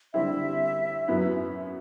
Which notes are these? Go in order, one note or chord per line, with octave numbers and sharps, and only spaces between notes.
D3 G3 C4 E4 E5
F#2 F#3 B3 E4